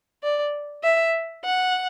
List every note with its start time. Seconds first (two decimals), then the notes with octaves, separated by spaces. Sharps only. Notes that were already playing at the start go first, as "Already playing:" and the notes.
0.23 D5
0.83 E5
1.44 F#5